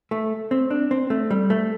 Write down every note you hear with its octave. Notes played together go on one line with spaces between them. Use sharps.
A3
C4
D4
C4
A3
G3
A3